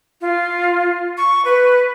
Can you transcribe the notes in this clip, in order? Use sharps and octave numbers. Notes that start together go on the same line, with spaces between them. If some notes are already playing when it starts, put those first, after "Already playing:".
F4
C#6
B4